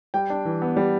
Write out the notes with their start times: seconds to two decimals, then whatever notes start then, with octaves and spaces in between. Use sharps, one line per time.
0.14 G3 G5
0.30 D4
0.45 E3
0.62 B3
0.77 G3